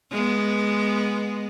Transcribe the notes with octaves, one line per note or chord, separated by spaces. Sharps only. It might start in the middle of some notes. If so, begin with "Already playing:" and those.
G#3 B3